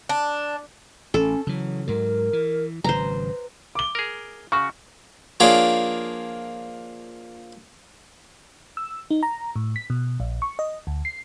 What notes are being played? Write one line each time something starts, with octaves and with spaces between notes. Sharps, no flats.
D4
A1 C#4 A4
C#3 E3 F#3
G#2 F#3 A#4
E3
G#1 C#3 F#3 B4 C5 A#5
D6 G7
G#4 A#4
C#3 F#4 C#6
F3 A#3 D4 G#4 C#5 F5
E6
D#4
A#5
A2
B6
B2
A#1
C#6
D#5
D2
C7